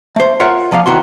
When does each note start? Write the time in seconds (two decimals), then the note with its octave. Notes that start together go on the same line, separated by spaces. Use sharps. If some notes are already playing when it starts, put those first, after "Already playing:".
0.16 A3 C5
0.40 F4 A#4 C#5 E5 F#5
0.71 C2 F3 A#3 D5 F5
0.86 D#2 D#3 E3 F#4 C6